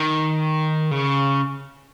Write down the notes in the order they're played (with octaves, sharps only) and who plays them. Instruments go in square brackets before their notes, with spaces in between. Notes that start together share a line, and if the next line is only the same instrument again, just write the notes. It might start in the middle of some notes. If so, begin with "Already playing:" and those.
Already playing: [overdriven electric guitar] D#3
C#3